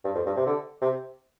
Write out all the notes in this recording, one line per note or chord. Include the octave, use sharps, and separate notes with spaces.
G2
F2
G2
C3
D3
C3